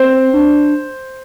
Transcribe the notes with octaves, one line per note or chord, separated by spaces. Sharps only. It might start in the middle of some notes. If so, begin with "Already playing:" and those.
Already playing: C4 C5
D4